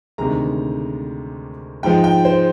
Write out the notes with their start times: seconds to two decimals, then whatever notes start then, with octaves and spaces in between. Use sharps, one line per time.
0.18 D2 C3 D#3 G#3 A#5
1.83 G#2 F3 G#3 G5
2.04 G5
2.25 C5